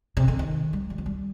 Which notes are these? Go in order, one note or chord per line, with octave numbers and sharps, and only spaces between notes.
C3
D3
D#3
G3
G3
F3
G3